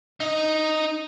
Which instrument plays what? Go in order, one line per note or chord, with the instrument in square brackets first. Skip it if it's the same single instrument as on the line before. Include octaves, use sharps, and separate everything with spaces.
[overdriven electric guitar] D#4 D#5